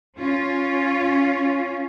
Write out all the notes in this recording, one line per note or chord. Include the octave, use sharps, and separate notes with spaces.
C#4 F4